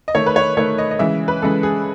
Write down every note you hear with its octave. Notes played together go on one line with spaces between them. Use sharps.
D#5
D#3 A3 C#5
B4
C#5
D#3 A3 C#5
D#5
D#5
C#3 E3 G#3 E5
B4
C#3 E3 G#3 A4
G#4